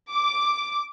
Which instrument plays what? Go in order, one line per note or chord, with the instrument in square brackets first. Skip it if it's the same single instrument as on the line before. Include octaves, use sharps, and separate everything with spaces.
[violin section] D6